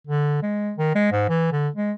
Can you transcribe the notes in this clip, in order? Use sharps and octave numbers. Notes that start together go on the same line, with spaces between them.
D3
G#3
D#3
G#3
G#2
E3
D3
G#3